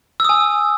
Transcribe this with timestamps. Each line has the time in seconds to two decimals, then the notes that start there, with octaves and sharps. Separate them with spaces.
0.20 E6
0.25 D#6
0.29 G#5